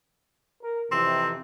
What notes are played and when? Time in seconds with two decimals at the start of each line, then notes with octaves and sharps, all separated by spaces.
0.62 A#4
0.91 F2 C3 E3 C4